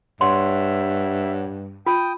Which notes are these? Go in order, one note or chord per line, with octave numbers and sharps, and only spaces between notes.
G2 C#5 E5 F#5 C6
F4 G5 D#6